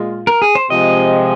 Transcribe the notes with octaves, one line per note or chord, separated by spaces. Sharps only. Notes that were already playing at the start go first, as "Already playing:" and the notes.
Already playing: A#2 G#3 F4
A#4
G#4
C5
C3 F3 G#3 D#5